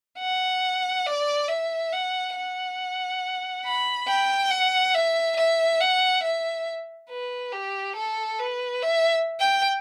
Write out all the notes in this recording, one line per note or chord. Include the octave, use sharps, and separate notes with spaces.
F#5
D5
E5
F#5
F#5
B5
G5
F#5
E5
E5
F#5
E5
B4
G4
A4
B4
E5
G5